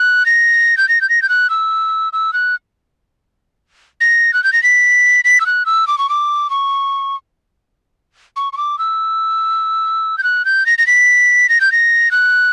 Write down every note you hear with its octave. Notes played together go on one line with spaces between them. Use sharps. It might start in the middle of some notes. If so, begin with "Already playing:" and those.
Already playing: F#6
A#6
G6
A#6
G6
A#6
G6
F#6
E6
E6
F#6
A#6
F#6
G6
A#6
B6
B6
E6
F#6
E6
D6
C#6
D6
C#6
C#6
C#6
D6
E6
G6
F#6
G6
A#6
A#6
B6
A#6
G6
A#6
F#6